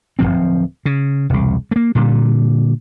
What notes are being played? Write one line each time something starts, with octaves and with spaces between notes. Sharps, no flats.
D1 D#2 F3 C4
C#3
E1 C2
A3 A#3
A#2 D3 G3